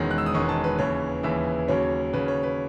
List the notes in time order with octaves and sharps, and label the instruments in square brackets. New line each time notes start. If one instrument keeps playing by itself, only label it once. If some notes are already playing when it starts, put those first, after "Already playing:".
Already playing: [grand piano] E1 E2 D#3 G#3 C#4
F#6
E6
D#6
E1 E2 D#3 G#3 C#4 C#6
A5
B4
D#2 C#3 E3 C#5
D#2 C#3 E3 E5
D#2 C#3 F#3 C#4 C#5
D#2 C#3 F#3 C#4 B4
C#5
B4